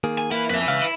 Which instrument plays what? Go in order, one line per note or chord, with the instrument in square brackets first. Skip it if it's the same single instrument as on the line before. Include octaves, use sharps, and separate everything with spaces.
[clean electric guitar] D#3 A#3 G#4
[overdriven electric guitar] G#5
[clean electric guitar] A#3 [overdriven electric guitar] E4 B4
[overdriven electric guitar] F2 [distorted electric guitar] B4 E5
[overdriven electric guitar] C#2 [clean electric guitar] F5
[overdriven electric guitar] E4